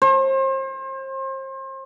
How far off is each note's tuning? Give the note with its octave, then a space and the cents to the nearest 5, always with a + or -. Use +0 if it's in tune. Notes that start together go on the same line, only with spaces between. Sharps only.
C5 +35